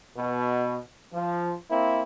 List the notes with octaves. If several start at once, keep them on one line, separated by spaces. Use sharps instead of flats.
B2
F3
A#3 C4 E4